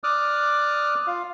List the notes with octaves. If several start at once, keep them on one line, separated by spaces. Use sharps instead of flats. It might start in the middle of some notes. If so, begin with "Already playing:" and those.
D5 D6 D#6 F6 F#6
F4 F5